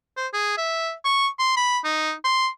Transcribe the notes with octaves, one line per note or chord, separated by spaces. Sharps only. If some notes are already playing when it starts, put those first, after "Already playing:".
C5
G#4
E5
C#6
C6
B5
D#4
C6